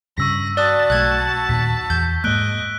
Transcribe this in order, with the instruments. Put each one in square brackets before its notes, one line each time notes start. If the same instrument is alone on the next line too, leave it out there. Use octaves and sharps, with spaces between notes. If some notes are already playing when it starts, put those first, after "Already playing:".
[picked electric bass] G2 C#3 [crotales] C#6 E6 B6 [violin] A#6
[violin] F#4 A5 [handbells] D5 D#6 F#6
[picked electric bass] B1 A3 [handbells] F#6 G#6
[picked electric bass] D#2 A#2 D#3 [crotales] B6
[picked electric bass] E2 [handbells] G6
[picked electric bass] G#2 G#3 A#3 [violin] D#5 [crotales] F#6 D7 G7